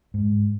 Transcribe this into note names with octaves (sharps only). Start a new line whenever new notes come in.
G#2